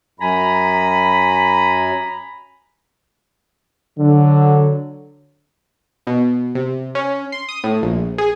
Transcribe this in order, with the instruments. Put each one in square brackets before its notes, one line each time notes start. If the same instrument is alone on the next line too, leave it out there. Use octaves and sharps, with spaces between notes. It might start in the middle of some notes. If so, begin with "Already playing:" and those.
[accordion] F#2 [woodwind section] G#5 A#5 B5
[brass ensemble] D3 F#3
[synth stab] B2
C3
C#4
C6
D#6
A2
A#1
G#4